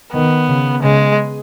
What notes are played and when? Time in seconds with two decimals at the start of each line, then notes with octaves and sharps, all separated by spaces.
0.13 D#3 B3
0.48 C#3
0.83 C#3 G#3